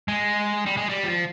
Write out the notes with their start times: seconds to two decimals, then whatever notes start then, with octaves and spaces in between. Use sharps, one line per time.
0.08 G#3
0.66 G3
0.77 G#3
0.89 G3
1.04 F3